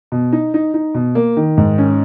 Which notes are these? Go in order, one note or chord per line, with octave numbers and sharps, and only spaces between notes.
B2
D#4
D#4
D#4
B2
A#3
D#3
G#2
C#4